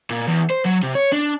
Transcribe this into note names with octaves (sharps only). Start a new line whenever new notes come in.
A#2
E2
C5
F#3
C3
C#5
D4